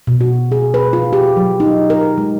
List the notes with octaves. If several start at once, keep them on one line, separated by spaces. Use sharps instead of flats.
B2
F#4
G#4
B4
F4
G4
F#3
D#4
A#4
G#3